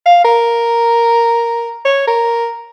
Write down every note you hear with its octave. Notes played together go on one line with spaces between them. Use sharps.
F5
A#4
C#5
A#4